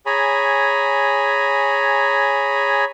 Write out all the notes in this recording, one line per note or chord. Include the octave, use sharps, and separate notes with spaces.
G#4 C#5 G#5 A#5 B5